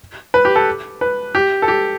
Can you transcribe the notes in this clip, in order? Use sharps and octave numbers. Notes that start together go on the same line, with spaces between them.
B4
G4
A4
B4
G4
A4
G4